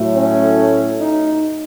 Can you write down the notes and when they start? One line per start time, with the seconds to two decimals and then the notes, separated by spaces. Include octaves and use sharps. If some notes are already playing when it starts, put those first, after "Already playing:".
Already playing: A2 F#3 A3
0.14 C#4
0.99 D#4